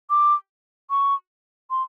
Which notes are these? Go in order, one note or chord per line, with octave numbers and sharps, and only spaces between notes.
D6
C#6
C6